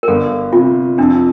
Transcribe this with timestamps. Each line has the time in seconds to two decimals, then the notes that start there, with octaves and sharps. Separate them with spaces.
0.03 A#4
0.08 G1 A4
0.53 C3 F4
0.98 F2 D4